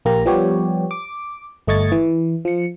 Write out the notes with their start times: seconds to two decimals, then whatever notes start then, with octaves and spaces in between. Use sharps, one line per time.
0.05 A#1 A#3 G4 A#5
0.26 F3 G3 B3 G4 C#5
0.91 D6
1.67 G1 A3 D#5 C#6 G#6 A6
1.92 E3
2.45 F3 C#7